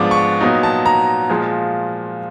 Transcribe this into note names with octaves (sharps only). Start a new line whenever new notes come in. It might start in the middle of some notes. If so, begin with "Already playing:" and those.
Already playing: G#2 F3 G#3 B3 D4 D6
C#6
A#2 F#3 B3 D#4
A5
A#5
A#2 F3 G#3